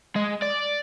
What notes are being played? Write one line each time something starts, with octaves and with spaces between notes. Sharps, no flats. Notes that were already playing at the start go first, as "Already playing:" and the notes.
G#3
D5